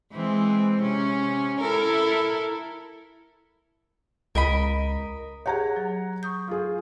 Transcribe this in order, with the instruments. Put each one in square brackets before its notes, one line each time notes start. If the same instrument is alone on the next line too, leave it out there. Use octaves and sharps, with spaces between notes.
[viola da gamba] E3 G#3 C4
C3 C#4
E4 A4 A#4
[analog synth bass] C#2 [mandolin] A#4 D#5 B5
[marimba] G4 G#4 [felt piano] C#5 F#5 A#5
[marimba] F#3
C#6 D#6 G6
[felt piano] F4 G#4